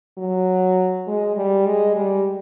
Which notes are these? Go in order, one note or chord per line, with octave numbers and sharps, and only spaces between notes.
F#3
G#3
G3
G#3
G3